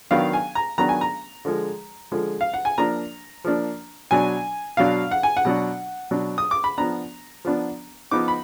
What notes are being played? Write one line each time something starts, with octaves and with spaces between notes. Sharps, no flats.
D#3 F#3 B3 D4 F5
G#5
A#5
D#3 F#3 B3 D4 A#5
G#5
A#5
D3 F3 G#3
D3 F3 G#3
F5
F#5
G#5
F3 A#3 D4 A#5
F3 A#3 D4
B2 F#3 D4 G#5
B2 F#3 D4 F5
F#5
G#5
F#5
B2 F#3 D4
B2 F#3 D4
D#6
D6
B5
F3 B3 D4 A#5
F3 B3 D4
F3 B3 D#4 D6
B5